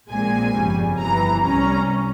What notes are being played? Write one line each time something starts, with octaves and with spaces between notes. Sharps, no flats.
A#1 A#2 G#3 C4 G#5
G1 F2 C#3 G3
G1 F2 C3 E3 A#5
C2 C3 G3 C#4 A#5